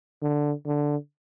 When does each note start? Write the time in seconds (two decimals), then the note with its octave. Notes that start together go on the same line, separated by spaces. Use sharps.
0.22 D3
0.66 D3